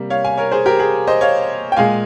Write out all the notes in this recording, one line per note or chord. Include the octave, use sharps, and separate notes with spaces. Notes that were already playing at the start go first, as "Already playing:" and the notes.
Already playing: C3 G3 A#3
C#5 F5
F5 G#5
A#4 C#5
G#4 C5
G4 A#4
G#4
C5 D#5
C#5 F5
G5
A#2 G#3 F5 G#5